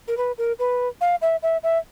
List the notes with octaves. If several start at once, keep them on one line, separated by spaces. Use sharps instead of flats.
A#4
B4
A#4
B4
F5
E5
E5
E5